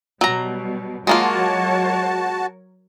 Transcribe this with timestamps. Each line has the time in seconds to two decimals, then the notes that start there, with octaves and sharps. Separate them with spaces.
0.21 B2 F#3 G3 A#5
1.07 F#3 G#3 A#3 F4 F#4 A#4 C#5 A5